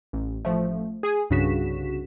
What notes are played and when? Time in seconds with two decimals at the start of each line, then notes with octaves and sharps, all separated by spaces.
0.13 A1
0.45 A1 F3 A3
1.03 G#4 G#5 D#6
1.30 C2 G2 C#3 F#4 B6 E7